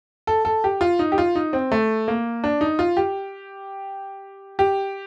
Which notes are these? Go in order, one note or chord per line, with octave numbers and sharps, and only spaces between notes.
A4
A4
G4
F4
D#4
G4
F4
D#4
C4
A3
A#3
D4
D#4
F4
G4
G4